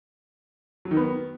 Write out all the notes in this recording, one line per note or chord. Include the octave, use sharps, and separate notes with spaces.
F#3
D#3
B3